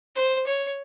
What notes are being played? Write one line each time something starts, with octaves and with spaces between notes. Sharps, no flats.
C5
C#5